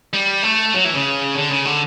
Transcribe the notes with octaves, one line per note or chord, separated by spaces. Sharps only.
G3
A3
F#3
E3
C#3
D3
C#3
D3